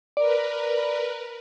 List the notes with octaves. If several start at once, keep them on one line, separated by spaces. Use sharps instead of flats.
A#4 B4 D5